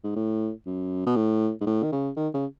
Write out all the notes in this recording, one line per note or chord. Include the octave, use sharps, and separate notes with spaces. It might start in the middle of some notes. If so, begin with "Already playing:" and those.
G#2
A2
F#2
B2
A2
G#2
A2
D#3
C#3
D#3
C#3